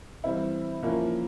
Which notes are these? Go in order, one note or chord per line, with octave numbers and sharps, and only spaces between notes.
E3 G3 C4 E4
F3 A#3 C#4 E4